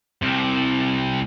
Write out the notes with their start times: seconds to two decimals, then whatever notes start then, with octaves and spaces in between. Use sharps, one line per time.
0.22 C2 C3